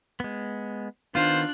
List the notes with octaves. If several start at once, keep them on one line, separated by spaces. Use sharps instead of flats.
G#3 B3
D#3 B3 D4 F4 C5 F#6